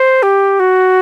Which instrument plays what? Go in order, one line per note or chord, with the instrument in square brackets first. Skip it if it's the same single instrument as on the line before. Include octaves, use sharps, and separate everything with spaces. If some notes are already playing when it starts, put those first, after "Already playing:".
Already playing: [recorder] C5
G4
F#4